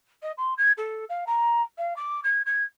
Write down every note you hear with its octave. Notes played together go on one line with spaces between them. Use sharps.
D#5
C6
G#6
A4
F5
A#5
F5
D6
G#6
G#6